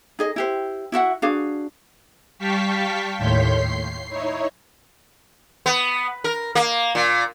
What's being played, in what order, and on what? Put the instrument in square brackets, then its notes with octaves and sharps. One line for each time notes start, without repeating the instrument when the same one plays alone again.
[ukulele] D#4 G#4 D#5
E4 G4 C5
E4 F#4 E5 F#5
D4 F#4 G#4 F5
[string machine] G3 F5 G5 A5 C#6 B6
D#2 A2 C#5 C6 G6 B6
C7
D#4 E4 C#5
[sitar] B3
A#4
A#3
A#2